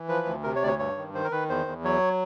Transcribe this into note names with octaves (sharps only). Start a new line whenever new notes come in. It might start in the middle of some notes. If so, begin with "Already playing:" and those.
Already playing: E3
F3 B4
D2
C3 A#4
C#5
D2 D5
C#5
G2 C#5
D#3
D#3 C5
A#4
D#3 B4
E2 C5
E2
F#3 C#5